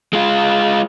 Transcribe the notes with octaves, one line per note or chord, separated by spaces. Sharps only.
G#3 F4